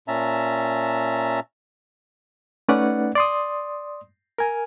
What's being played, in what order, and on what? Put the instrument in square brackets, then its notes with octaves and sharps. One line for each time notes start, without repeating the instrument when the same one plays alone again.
[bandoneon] A#2 C#4 E5 A5 A#5
[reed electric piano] A3 C#4 D#4 B4 D5 F#5
D5 C6 D#6
A#4 G#5